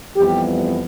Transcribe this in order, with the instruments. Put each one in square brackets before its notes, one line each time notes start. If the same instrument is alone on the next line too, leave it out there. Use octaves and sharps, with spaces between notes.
[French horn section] F2 E3 G3 B3 G4